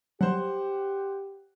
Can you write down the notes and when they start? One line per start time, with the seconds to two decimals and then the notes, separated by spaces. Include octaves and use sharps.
0.21 F#3 G3 G4 C5 F#5